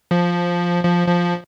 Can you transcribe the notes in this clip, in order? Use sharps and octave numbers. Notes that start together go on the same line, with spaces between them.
F3
F3
F3